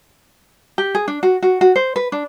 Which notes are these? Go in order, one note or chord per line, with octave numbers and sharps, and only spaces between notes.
G4
G#4
D4
F#4
F#4
F#4
C5
B4
D4